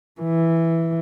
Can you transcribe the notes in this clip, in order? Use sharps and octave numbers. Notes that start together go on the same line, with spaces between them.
E3